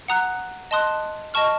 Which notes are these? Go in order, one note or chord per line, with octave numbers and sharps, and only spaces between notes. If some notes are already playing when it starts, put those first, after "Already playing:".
F#5 A#5 D#6 F#6
D#5 A5 C6 D#6 F#6
D#5 A5 C#6 F6